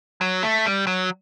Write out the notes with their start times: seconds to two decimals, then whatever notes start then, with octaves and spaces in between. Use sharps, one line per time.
0.21 F#3
0.43 A3
0.66 G3
0.87 F#3